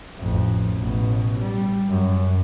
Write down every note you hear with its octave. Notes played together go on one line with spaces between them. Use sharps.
A1 F2
A1 B2
G3
F#2